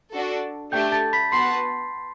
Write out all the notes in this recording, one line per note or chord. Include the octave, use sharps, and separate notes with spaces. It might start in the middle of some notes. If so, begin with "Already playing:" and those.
D4 F#4 A4
A3 D4 G4 G5 G6
A5 A6
B5 B6
B3 F#4 B4 F#5 A5 C6 C7